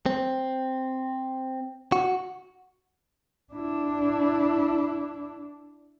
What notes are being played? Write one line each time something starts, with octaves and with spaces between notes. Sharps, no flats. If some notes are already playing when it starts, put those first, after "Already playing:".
C4
F#4
D4 E4